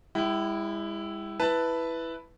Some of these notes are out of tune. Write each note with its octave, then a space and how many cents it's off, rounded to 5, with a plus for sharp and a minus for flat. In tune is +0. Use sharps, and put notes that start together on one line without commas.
G#3 -45 E4 +0 G5 -30
E4 +0 B4 +0 A5 +5